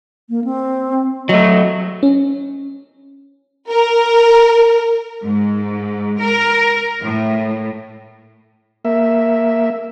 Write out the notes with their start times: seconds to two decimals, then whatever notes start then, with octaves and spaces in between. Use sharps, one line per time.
0.30 A#3
0.44 C4
1.29 F#3 A3 D#5
2.03 C#4
3.71 A#4
5.23 G#2
6.19 A#4
7.01 A2
8.85 A#3 E5